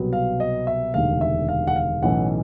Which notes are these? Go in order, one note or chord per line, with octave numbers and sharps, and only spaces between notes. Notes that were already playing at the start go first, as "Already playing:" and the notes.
Already playing: C2 B2 F#3 B3
F5
D#5
E5
E1 D2 C3 D#3 F5
E5
F5
F#5
F5
B1 A2 E3 A3 C#4 F#5